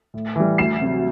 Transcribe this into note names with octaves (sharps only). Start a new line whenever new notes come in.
A2
E3 G3
D2 C7 E7
C3 F#3